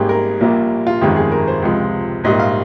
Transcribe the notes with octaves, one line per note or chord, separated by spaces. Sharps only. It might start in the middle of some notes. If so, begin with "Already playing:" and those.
Already playing: G#1 G#2 G3 A#3 G4 G#4
A#4
A#1 A#2 G3 A#3
F4
G1 F2 D#3 G#3 G4
G#4
A#4
C5
C#2 C3 F3 G#3
A#1 G#2 G3 A#3 D#5
F5